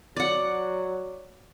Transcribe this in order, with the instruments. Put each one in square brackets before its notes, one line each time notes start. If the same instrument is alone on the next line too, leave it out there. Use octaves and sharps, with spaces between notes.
[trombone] F#3 [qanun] D5 F#5